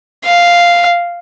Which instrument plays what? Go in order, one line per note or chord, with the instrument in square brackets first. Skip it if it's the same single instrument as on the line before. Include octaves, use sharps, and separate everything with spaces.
[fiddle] F5